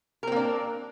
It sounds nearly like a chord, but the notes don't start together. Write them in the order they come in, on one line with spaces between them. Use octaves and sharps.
A#4 C4 A#3 D4